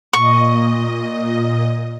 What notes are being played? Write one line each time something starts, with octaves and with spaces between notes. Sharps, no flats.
A#2 D#5 C#6